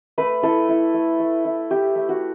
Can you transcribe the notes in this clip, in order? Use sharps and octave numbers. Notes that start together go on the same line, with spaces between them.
A3 B4
E4 A4
E4
A3
A3
E4
E4 G4
A3
F#4